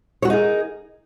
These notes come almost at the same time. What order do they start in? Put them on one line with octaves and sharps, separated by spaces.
C#5 F#4 A#4 D#4 G#4